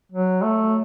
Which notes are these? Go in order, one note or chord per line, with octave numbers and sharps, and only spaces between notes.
F#3
A3